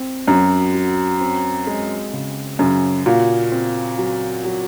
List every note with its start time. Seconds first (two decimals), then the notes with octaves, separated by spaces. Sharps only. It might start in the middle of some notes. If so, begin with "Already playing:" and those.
Already playing: C4
0.28 F#2 F#3
0.74 F#3
1.20 C4
1.67 G#3
2.13 C#3
2.59 F#2 C#3
3.06 A#2 F#4
3.51 C4
3.98 F#3
4.44 F#3